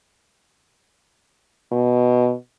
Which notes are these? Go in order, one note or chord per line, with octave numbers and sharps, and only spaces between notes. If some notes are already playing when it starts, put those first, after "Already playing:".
B2